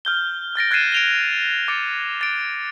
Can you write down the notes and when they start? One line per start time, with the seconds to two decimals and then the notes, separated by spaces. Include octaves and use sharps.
0.05 F6 G6 G7
0.56 F6 A6 A#6 D7
0.71 F#6 G#6 A6 C7 D#7 E7
0.92 D7 F7 G7
1.68 D6 A6 C#7 D7
2.21 A6 D7